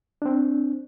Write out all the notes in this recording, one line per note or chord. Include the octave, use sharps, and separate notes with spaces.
C4 D4